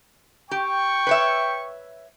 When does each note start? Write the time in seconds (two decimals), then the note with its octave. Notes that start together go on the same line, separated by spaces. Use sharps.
0.51 G4 G5 C#6
1.07 B4 C#5 E5